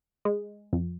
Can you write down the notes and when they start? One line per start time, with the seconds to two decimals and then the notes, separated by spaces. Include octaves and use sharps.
0.25 G#3
0.73 F2